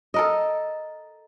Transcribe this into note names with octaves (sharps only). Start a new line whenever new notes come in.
A4 A#4 D#5